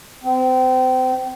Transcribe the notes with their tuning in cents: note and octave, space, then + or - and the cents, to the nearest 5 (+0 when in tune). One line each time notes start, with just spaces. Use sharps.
C4 -30